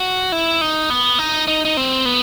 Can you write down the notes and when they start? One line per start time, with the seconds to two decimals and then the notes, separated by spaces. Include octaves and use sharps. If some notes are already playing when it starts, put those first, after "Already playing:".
Already playing: F#4
0.32 E4
0.61 D#4
0.90 B3
1.19 D#4
1.48 D#4
1.65 D#4
1.77 C4
2.05 B3